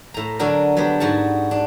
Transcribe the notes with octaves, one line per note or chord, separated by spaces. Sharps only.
A2 A#5
D3 F#3 D4 F#4 A#4
F#3 G3 B3 D4
G#2 F#4 F#5 A5
D4